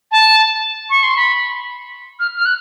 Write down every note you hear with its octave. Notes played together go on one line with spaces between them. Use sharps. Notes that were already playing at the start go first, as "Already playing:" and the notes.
A5
C#6
C6
B5
F6
F6
F#6